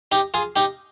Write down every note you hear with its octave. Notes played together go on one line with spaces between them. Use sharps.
D#4 G4
F4 G#4
D#4 G4